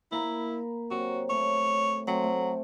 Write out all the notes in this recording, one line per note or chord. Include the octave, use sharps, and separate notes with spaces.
A#3 E4 A#5 B5
C3 F#3 F#4
A3 C#5
F#3 A3 C4
A3